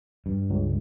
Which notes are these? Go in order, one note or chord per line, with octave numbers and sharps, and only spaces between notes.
G2
C#2